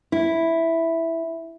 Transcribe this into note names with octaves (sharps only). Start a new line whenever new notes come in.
E4